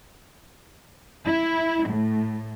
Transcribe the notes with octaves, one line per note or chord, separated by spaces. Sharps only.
E4
A2